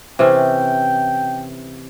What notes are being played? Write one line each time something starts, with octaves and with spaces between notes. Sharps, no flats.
C3 E3 C#4 G5